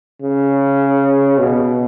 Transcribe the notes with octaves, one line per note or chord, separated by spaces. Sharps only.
C#3
B2